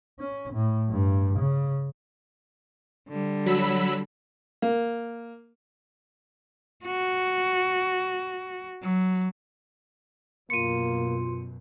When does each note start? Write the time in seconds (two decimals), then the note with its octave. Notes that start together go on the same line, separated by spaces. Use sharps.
0.19 C#4
0.53 A2
0.90 G2
1.39 C#3
3.09 D3 G3
3.46 F#3 B5 E6
4.62 A#3
6.86 F#4
8.83 F#3
10.50 F#2 B2 A#3 F4 C6 C#7 D#7